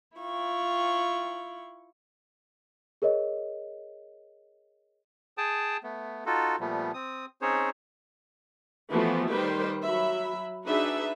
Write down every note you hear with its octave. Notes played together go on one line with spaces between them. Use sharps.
E4 F4 C#6
G#4 A#4 C#5 D#5
G#4 G5 A5 D#6
A3 B3
D#4 F4 F#4 A4
A#2 F3 G3 A3 B3
C4 D#6
C4 C#4 D#4 G#4 C5 C#5
E3 F3 A3 B3 F4 F#4
D#3 G3 B4 C5 G5
F#3 E5 B5
D4 D#4 F#4 G#4 B4 E5